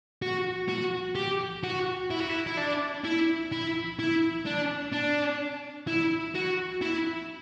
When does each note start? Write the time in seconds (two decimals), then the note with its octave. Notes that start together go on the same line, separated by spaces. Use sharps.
0.22 F#4
0.69 F#4
1.15 G4
1.64 F#4
2.10 E4
2.20 F#4
2.29 E4
2.47 E4
2.57 D4
3.04 E4
3.52 E4
3.99 E4
4.46 D4
4.93 D4
5.87 E4
6.35 F#4
6.82 E4